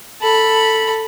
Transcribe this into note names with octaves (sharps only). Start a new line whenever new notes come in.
A4 B5